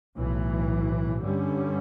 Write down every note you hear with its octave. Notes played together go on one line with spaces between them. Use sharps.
B1 A2 E3
G2 D3 G3 C#4